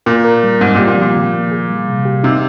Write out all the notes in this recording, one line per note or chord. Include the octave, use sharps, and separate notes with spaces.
A#2 A#4
A#4
G3
G#2 C4
A#2
G4
A#2
A#2 F3
D#3
A#3
G#4
G3
C3
G4
C3 D#4